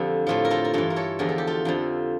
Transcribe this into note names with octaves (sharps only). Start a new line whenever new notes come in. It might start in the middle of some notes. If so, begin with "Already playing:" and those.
Already playing: F2 D3 F3 G4
A2 F3 F4 A4
A#4
F4 A4
A#4
G2 E3 F4 A4
A#4
A4 C#5
E2 D3 F3 A#4
A4
G4
F4 A4
F2 D3 F3